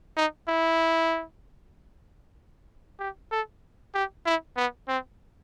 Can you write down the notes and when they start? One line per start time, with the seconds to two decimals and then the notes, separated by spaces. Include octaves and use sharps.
0.17 D#4
0.48 E4
2.99 G4
3.32 A4
3.95 G4
4.26 E4
4.57 B3
4.88 C4